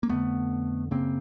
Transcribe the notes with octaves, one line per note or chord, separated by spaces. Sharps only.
A#3
F2 D3 A3 B3
F#2 C#3 A#3 C4